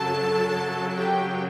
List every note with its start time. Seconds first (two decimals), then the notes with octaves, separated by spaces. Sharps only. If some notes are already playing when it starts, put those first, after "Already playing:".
Already playing: F#2 C#3 F#3 A4 A5
0.96 G4 G5